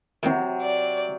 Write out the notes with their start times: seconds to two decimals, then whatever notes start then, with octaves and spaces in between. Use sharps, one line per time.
0.23 C3 D#3 E3 F#3 C4
0.62 D5